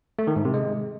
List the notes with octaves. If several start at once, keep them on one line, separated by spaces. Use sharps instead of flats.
A3
D#3
G#2
C3
G#3